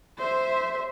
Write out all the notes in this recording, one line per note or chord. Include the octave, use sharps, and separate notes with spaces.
C5 E5